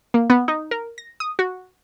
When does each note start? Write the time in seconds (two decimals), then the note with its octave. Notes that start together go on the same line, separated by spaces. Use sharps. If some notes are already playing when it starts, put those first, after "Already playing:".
0.14 A#3
0.30 B3
0.48 D#4
0.71 A#4
0.98 A#6
1.20 D#6
1.39 F#4